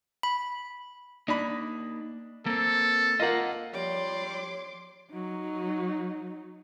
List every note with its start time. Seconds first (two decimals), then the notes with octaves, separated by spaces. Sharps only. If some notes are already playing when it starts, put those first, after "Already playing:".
0.23 B5
1.28 A#3 D4 D#4 B5
2.46 A#3 C4 A4
3.20 A#3 F4 D#5 F#5
3.73 F3 G3 C#5 C6 D6
5.11 F#3 D#4